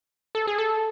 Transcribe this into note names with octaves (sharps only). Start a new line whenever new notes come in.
A4
G#4
A4